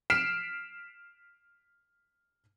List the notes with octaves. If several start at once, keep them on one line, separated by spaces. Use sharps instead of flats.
F6 B6 C7 D7 E7